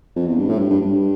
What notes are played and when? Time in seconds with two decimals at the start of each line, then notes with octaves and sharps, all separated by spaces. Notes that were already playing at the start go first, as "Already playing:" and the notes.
0.16 F2
0.27 E2
0.38 G2
0.49 A2
0.59 G2
0.70 G2
0.81 G2